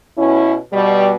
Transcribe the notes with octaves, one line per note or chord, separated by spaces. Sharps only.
B2 C#4 E4
B2 G3